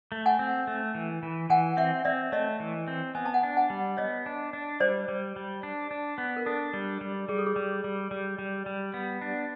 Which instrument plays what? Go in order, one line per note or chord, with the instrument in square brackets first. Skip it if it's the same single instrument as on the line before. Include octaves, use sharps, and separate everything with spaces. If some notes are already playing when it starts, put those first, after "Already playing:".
[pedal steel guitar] A3
[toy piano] F#5 G#5
[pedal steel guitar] C4
A3
E3
E3
[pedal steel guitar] E3 [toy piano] F#5 G#5
[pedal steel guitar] C4 [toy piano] E5 F#5
[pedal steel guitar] C4 [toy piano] D5 E5
[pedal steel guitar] A3 [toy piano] C#5 D#5
[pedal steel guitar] E3
C4
[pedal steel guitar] B3 [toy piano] G#5
[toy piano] A5
F#5 G#5
[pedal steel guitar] D4
[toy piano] F#5 G#5
[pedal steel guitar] G3
[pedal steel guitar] B3 [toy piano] C#5 D#5
[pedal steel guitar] D4
D4
[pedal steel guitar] G3 [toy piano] C5 D5
[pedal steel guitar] G3
G3
D4
D4
B3
[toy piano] A#4
[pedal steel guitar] D4 [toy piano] A4
[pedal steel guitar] G3
G3
[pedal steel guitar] G3 [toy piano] G#4
[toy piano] A4
G#4
[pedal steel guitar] G3
G3
G3
G3
G3
B3
D4